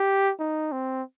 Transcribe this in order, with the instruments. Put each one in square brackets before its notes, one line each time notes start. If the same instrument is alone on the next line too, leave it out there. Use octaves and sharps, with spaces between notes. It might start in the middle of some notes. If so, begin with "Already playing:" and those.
Already playing: [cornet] G4
D#4
C4